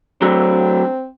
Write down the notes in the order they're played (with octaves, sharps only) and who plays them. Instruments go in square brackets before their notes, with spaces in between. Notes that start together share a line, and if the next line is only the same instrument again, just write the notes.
[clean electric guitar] F#3 A3 D4 [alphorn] C4